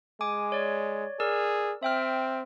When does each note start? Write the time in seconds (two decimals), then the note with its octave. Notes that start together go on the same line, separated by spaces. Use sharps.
0.21 G#3 G#5 D6
0.52 C#5 D5
1.20 G#4 A#4 D5 E6
1.83 C4 E5 G5 F6